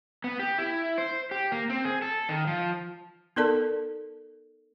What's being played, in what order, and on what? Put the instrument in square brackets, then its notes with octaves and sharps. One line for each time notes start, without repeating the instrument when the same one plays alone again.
[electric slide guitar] B3
G4
E4
C5
G4
A#3
C4
G#4
A4
D#3
F3
[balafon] B3 D#4 A4 A#4 D5 A5